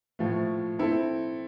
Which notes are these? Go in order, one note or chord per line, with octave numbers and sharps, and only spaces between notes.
A2 F3 A3
C4 E4 A4